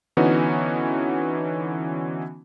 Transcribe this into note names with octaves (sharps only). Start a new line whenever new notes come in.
D3 E3 B3 C#4 D#4 F#4